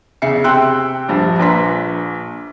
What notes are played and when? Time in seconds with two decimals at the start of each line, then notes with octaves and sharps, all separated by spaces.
0.22 E2 C#3 E5 C7 C#7
0.44 C3 G5 C6 E6 F#6
1.08 A#1 G2 F3
1.39 A#1 D4 B4 A#5 C6 B6